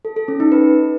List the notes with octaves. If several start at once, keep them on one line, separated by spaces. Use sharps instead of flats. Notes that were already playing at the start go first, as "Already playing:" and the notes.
A4
A4
C#4
D#4
B4